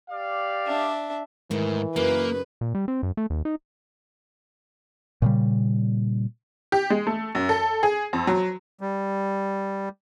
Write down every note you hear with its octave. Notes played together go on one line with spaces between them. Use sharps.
G4 D5 F5
D4 E5
G#2 D#3 E3 A3
F#2 C#3 A#3 D#4 B4
A#2
G3
C4
F#2
A3
D#2
D#4
A#2 C#3 G3
G4
G#3
A3
F#2
A4
G#4
F2
F#3
G3